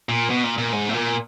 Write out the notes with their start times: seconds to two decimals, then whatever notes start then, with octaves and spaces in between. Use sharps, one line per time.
0.09 A#2
0.30 B2
0.43 A#2
0.58 A#2
0.73 G#2
0.89 A2
0.94 A#2